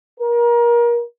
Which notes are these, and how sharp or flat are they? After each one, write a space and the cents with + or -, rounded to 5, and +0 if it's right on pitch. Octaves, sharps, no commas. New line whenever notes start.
A#4 +30